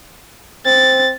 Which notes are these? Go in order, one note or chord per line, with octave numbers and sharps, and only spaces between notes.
C4 A6